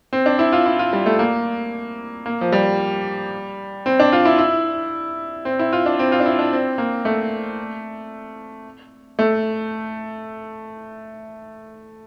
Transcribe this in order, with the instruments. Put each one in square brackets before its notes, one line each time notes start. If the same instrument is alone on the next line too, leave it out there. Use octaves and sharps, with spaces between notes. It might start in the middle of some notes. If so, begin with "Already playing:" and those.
[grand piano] C4
D4
E4
F4
E4
F4
G3
A3
A#3
A#3
F3
G3
C4
D4
F4
E4
E4
C4
E4
F4
D4
C4
F4
D4
E4
D4
C4
A#3
A3
A3